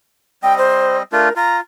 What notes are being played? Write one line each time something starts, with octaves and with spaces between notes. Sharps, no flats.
G3 C4 D#5 G5
C5
A3 D4 F4 A#4
F4 A#5